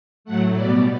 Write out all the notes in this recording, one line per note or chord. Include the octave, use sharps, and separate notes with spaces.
A2 F#3 A3 F#5
B2 G3 B3 D5